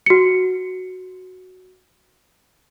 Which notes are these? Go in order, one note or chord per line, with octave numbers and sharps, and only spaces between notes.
F#4 C#7